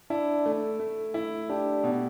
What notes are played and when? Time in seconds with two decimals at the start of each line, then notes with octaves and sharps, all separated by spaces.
0.10 D4 E4
0.46 A3
0.79 A3
1.14 E4
1.50 D4 G4
1.84 B2